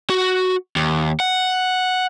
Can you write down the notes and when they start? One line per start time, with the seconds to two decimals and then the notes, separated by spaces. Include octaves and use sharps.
0.10 F#4
0.76 D#2
1.20 F#5